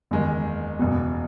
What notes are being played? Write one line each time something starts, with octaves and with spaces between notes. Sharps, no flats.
F#1 E2 D#3 G#3
F#1 E2 B2